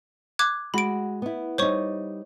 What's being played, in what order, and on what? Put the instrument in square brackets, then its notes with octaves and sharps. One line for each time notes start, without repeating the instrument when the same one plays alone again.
[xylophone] D6 F#6 G#6
[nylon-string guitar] G#3 F#4 [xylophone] B5 D7
[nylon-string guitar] B3 E4
[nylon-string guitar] G3 D#4 [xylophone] C5 C#5 C#6